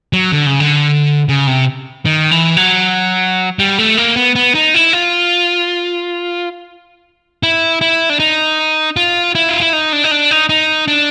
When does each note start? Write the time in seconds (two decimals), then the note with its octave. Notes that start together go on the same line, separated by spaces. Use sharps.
0.13 F#3
0.32 D3
0.46 C#3
0.60 D3
1.29 C#3
1.47 C3
2.05 D#3
2.31 E3
2.57 F#3
3.59 G3
3.79 A3
3.97 A#3
4.16 B3
4.35 B3
4.55 D#4
4.74 E4
4.93 F4
7.43 E4
7.81 E4
8.10 D4
8.19 D#4
8.97 F4
9.35 E4
9.49 F4
9.60 E4
9.73 D#4
9.93 D4
10.04 D#4
10.11 D4
10.31 D#4
10.49 D#4
10.88 D4